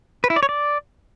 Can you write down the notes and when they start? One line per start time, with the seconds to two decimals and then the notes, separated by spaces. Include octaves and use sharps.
0.24 B4
0.30 E4
0.36 D5
0.43 C#5
0.49 D5